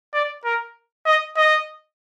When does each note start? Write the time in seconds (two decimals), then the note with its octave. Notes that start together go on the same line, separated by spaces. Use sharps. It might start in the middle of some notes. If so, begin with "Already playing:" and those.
0.14 D5
0.45 A#4
1.06 D#5
1.37 D#5